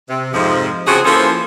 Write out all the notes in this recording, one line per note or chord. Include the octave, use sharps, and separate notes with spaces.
C3
F2 G#2 C3 F3
C#3 F3 C4 F#4 G#4
E3 F3 A#3 C#4 A4 C5